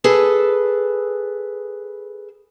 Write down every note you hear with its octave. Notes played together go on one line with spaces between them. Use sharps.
G#4 A4 B4